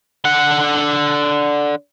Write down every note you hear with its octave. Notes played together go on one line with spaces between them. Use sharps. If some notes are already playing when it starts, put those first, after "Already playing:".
D3 F#5